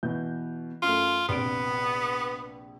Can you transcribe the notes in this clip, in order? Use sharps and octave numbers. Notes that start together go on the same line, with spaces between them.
B2 E3 G6
F#2 A3 F4
A#1 C3 B3 D7